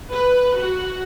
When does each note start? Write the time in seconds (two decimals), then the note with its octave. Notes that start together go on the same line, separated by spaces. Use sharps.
0.10 B4
0.55 F#4